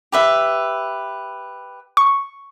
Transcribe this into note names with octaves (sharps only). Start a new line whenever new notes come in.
G4 B4 E5
C#6